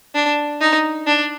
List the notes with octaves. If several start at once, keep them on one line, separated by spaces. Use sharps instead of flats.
D4
D#4
D4